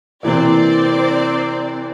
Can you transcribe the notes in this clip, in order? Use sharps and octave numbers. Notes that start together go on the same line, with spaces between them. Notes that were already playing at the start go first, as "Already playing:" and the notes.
C3 E3 A#3 C4 D5